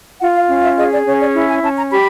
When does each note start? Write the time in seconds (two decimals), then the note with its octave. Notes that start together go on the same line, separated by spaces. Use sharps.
0.20 F4 F#5
0.35 F5
0.48 C#4 F5
0.62 E5
0.78 G#4 D#5
0.92 D5
1.06 C#4 C#5
1.20 D5
1.35 E4
1.48 G#5
1.63 C#4 A5
1.77 A#5
1.91 G4 B5